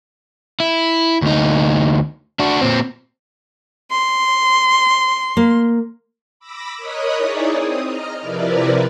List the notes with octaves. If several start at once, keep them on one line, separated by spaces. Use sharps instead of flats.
E4
D2 D#4
D4 F#4
A#2 C4
C6
A#3
B5 D6 E6 A#6
A#4 C#5 D#5 B5 D#6 F#6
D#4 E4 G#4 C#5 D5
C4 D#6
D#5 A#5 F6
C3 F3 E4 A#4 B4 D5